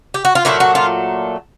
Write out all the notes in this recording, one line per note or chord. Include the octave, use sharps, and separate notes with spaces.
G4
F#4
F4
A#2 F#3 A3 E4
F#4
F4